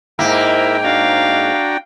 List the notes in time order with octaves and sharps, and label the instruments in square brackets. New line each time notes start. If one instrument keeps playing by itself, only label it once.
[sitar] G#2 A#3 [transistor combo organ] E4 A#4 E5 [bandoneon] G5
[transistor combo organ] D4 F#4 A#5 [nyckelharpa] F5